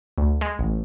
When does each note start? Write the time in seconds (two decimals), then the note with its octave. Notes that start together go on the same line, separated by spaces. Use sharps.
0.18 D2
0.41 G#3
0.59 A1